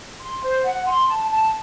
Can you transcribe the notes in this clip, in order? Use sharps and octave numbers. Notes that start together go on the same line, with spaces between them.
C6
C5
F#5
C6
A5
A5